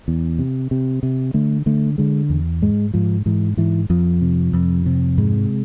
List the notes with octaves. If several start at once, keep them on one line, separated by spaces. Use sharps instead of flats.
E2
C3
C3
C3
D3 A3
D3 A3
D3 G#3
E2
G#2 G#3
G#2 F3
G#2 E3
G#2 E3
F2 F3
C3
F2
C3
G#2 G#3